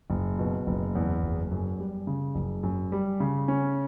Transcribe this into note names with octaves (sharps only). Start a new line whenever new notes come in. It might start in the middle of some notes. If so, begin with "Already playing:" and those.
F#1
B2
F#1
E2
F#1
F#2
G3
C#3
F#1
F#2
G3
C#3
C#4